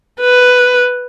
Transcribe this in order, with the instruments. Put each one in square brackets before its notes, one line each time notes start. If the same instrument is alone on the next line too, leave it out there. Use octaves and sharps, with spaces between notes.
[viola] B4